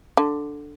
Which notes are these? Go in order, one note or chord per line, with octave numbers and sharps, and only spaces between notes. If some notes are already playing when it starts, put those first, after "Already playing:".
D3